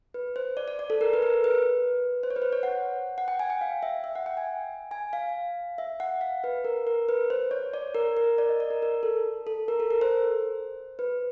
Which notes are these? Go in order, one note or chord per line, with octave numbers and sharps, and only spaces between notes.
B4
C5
D5
D5
D5
A4
A#4
B4
A#4
B4
C5
C#5
B4
C5
C#5
F#5
F#5
G5
G#5
G5
F5
E5
E5
F#5
G5
G#5
G#5
F5
E5
F#5
F5
B4
A#4
A#4
B4
C5
C#5
D5
A#4
A#4
D5
D#5
D5
A#4
A#4
A4
A4
A#4
A4
A#4
C5
B4